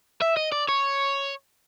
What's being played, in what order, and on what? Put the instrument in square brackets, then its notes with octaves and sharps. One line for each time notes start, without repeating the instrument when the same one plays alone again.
[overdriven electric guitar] E5
D#5
D5
C#5